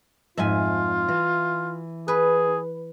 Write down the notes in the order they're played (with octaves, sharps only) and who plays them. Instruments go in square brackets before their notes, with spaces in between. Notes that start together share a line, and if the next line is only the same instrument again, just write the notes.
[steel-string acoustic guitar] F2 G#2 [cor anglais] F4 [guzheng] E5 G#5
[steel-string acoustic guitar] E3
[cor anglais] G#4 [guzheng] B4